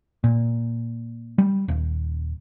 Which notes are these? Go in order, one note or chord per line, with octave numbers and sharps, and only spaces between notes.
A#2
G3
D#1